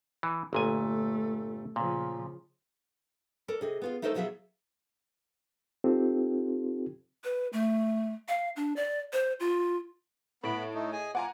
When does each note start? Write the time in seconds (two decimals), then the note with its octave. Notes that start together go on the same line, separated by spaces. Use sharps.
0.23 E3
0.53 G1 A#2 A3 G#5
1.76 A#2 C#3 F3
3.48 A4 A#4 D5
3.61 C3 G#4 D#5
3.82 B3 F4 G#4
4.02 A3 D#4 A4 A#4 C5 D#5
4.14 B2 F3 F#3 E4 G#4 E5
5.84 C4 D#4 F4 G4 A4
7.24 B4
7.53 A3
8.28 F5
8.56 D4
8.76 D5
9.13 C5
9.40 F4
10.44 A2 B3 B5 D7
10.74 A3 D#4
10.93 G#4 D#5 G#5
11.15 F4 F#5 G#5 A#5 D6